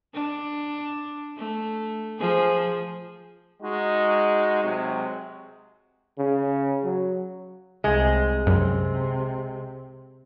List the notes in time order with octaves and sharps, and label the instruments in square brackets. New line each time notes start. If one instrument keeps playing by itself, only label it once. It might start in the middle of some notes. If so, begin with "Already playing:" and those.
[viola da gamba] D4
A3
F3 G#4
[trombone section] G#3 D#4 F#4
C3 F#3 G#3
[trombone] C#3
F#3
[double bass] C2 [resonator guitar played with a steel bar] G#3
[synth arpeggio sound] F#2 [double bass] C3